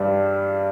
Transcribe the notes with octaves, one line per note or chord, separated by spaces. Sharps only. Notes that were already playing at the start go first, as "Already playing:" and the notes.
Already playing: G2 G3